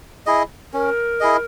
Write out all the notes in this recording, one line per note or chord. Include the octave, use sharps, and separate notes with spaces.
E4 G#4 D#5
C#4 A#4
E4 G#4 D#5